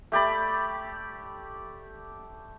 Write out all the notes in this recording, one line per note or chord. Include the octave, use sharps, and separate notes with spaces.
A3 G4 D5 B5